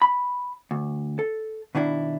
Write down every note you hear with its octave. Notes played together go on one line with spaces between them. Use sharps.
B5
D2
A4
B2 D#3 D4 E4